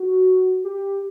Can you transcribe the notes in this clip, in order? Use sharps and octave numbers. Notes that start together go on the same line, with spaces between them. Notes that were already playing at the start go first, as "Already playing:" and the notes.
Already playing: F#4
G4